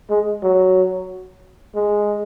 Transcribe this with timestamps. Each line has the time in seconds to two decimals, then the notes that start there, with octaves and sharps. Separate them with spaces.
0.10 G#3
0.43 F#3
1.75 G#3